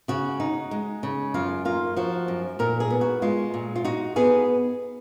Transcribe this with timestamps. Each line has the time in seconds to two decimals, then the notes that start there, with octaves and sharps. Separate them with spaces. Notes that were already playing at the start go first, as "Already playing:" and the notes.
0.08 C#3 F#4
0.40 D#4
0.71 G#3
1.03 C#3
1.34 F#2 F4
1.65 A#3 F4
1.96 F3 F#4
2.28 F#2
2.59 A#2 A#4
2.80 G#4
2.90 B3
3.01 F#4
3.22 G#3 F4
3.54 A#2
3.76 F4
3.84 D#4 F#4
4.16 B3 G#4